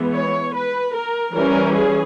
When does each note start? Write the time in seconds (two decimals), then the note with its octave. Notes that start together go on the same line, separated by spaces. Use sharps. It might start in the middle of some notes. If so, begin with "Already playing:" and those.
Already playing: E3 G#3 B3
0.13 C#5
0.54 B4
0.94 A#4
1.34 E3 G3 C#4 A#4
1.75 G#4